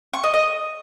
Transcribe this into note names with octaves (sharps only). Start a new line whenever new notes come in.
C#6
D#5
D#5